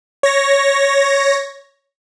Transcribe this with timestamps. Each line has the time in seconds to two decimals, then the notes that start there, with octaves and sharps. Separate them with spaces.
0.23 C#5 A#6